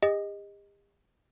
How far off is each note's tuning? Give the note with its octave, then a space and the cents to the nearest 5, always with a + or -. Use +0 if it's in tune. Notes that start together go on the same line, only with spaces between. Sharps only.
G4 +45 D#5 +0